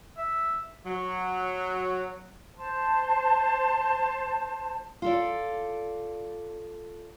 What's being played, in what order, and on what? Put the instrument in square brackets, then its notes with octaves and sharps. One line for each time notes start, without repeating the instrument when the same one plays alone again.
[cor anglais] E5
[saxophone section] F#3
[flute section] C5 A5
[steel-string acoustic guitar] F4 A4 D5